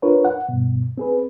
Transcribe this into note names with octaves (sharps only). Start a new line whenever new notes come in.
D4 F4 A#4 B4 C#5
F#5
G2 B2
C4 G#4 B4